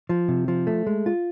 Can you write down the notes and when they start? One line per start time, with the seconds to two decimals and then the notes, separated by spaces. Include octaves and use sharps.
0.09 F3
0.28 C3
0.48 F3
0.67 A3
0.87 G#3
1.06 F4